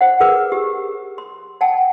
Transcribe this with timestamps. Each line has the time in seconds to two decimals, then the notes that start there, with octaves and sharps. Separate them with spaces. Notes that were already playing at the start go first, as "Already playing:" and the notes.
0.01 C5 F#5
0.20 G#4 A#4 B4 D6
0.52 G4
1.18 C6
1.61 F#5 G5 A5